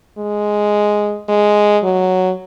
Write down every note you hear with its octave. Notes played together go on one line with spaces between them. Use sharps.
G#3
G#3
F#3